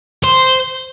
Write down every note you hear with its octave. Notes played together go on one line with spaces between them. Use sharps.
C5